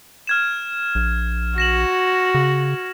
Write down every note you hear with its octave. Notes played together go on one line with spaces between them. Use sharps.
F6 G#6 E7
A#1
F#4 A#6 E7 F#7
C#3